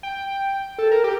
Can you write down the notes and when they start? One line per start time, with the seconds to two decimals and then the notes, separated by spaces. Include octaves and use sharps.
0.03 G5
0.78 A4
0.91 A#4
1.04 G4